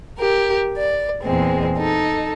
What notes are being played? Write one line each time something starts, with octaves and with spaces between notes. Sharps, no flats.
G4 A#4
D5
E2 A#2 G#3 C4
D#4 A4